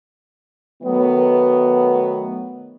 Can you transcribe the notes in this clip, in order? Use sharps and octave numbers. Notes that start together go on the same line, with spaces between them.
D#3 F#3 A3 B3